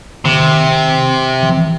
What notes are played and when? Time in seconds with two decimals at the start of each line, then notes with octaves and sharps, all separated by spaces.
0.25 C3 D#3
0.33 D3
0.40 D#3
1.43 E3
1.49 F3
1.57 E3